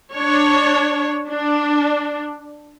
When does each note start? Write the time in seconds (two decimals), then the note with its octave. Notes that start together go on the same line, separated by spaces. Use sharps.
0.14 D4 C#5
1.28 D4